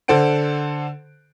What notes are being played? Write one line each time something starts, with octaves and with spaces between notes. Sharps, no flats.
D3 A4 C5 F#5 D7